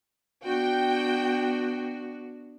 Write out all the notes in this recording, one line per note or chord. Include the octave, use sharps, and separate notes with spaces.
B3 D4 F#4 G5